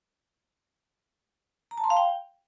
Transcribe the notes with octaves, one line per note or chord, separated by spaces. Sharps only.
A#5
A5
C6
F5
G5